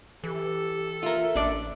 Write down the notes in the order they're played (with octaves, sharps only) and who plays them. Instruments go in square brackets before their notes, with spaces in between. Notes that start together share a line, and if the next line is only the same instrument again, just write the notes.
[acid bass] E3 [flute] G4 [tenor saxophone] A4
[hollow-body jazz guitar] F4 A#4 [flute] E5
[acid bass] A1 [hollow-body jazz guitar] D4 D5